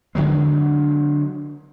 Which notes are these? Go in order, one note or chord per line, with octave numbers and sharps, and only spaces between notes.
D3 E3 F#3 G#3